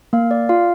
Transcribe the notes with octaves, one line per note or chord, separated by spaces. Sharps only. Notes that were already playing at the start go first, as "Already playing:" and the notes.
A#3 F5
D5
F4 F5